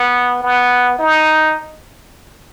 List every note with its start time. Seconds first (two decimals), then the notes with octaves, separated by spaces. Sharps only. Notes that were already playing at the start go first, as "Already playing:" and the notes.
Already playing: B3
0.43 B3
0.99 D#4